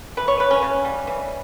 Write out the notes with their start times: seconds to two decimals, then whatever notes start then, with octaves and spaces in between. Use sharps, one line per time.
0.17 E3 B4
0.28 C#5
0.39 C#3 B4
0.51 C#4
0.62 C#3
0.85 G3
1.07 E3